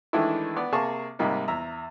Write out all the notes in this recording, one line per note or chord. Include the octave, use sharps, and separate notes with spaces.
D#3 E3 G#3 A3 D4 E4
B3 D5
C3 A#3 G#4 A5 C#6
G#2 C3 G3 A#3 D#4
E2 E5 A#5